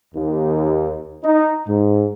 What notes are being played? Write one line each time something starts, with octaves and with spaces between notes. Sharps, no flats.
D#2
D#4
G#2